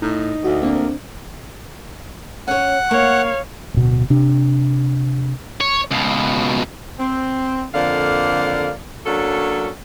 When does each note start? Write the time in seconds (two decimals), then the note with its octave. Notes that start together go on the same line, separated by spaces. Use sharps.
0.02 A2 D#4
0.44 D2 F#4
0.63 A#3 C4 D4
2.48 C#4 C#5 F#5
2.91 A#3 C#5 F5
3.74 D1 B2
4.10 C3 D4
5.61 C#5
5.91 C#2 B2
6.99 C4
7.74 F2 D3 A#3 D5 F5
9.06 F#3 A#3 C#4 D4 A4